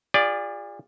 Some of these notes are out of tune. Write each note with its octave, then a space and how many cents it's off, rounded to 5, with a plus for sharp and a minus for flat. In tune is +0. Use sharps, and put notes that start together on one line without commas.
F4 +0 G#4 -40 D5 +0